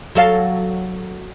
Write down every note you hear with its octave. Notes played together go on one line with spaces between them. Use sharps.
F#3 A4 F5